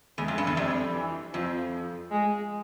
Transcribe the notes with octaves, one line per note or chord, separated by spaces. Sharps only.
E2 G#3
F2
G2
E2
F2 G3
E3
F2 F3
G#3